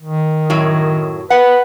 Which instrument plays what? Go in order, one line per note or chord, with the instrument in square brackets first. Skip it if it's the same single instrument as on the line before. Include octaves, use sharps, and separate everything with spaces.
[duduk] D#3
[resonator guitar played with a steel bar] F#2 A2 F#3
[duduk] B4 [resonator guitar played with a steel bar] F#5